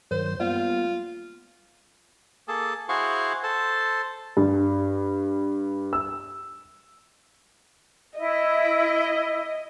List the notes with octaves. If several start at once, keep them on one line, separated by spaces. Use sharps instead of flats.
G2 D#3 F#3 C5
G3 A#3 B3 F4
A#3 G#4 A4
E4 F#4 G#4 C5 F5 C#6
A4 C5
G2
E6
E4 D#5